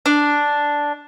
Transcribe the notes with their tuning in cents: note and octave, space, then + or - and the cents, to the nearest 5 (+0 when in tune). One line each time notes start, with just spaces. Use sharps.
D4 -5